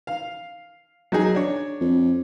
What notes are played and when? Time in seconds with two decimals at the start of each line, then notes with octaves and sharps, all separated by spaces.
0.07 F5
1.12 F#3 D#4 G#4
1.35 D4 C#5
1.81 F2